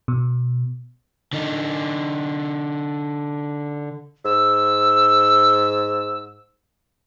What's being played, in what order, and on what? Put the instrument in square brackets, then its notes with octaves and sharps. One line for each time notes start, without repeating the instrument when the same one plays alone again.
[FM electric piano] B2
[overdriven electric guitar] D3 D#4
[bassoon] G#2 [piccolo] E6